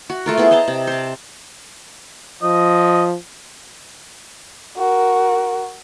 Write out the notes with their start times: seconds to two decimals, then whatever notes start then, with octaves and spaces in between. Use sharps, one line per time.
0.09 F#4
0.26 A3 F4 A#4
0.37 B3 E4 G#4 C5
0.51 C5 D#5 A5 A#5
0.68 C3
0.87 C5 A5
2.43 F3 D#5
4.77 F#4 A#4